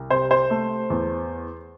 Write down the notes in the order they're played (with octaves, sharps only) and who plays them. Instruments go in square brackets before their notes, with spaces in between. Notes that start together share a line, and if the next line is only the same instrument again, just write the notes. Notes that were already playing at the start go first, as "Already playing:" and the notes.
Already playing: [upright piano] C2
C3 C5
C5
A3
E2